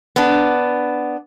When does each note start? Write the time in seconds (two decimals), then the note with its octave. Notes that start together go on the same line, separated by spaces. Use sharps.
0.16 B3 D4